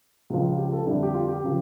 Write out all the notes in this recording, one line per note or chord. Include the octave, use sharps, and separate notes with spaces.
C#2 C#3 F3
G4
A4
F2 D3 G3 E4
G4
F4
G4
C#3 F3